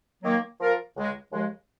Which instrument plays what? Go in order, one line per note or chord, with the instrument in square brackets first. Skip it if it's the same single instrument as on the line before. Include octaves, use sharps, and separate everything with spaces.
[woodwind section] D#3 F#3 A#3
F3 A#3 F4 A#4
C#2 C#3 G#3
D#2 C#3 F3 G#3